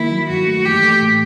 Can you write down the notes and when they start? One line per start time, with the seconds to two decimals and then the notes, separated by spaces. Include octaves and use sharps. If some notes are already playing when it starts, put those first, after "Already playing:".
Already playing: D#3 A#3 E4
0.11 F#3
0.29 G2 F#4
0.47 A3
0.65 E3 G4
0.83 A3
1.01 A2